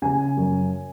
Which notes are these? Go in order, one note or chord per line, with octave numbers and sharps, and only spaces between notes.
C#3 G#5
F#2